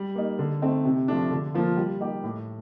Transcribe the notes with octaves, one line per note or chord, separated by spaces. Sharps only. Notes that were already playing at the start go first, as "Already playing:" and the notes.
Already playing: G3
A#3 D#4
D3
A3 C4 D#4
C3
F3 A3 D4
D3
F3 A#3 F4
G3
A#3 D#4 G4
A2